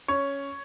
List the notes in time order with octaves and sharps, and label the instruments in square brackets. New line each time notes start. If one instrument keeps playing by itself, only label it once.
[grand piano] C#4 C#5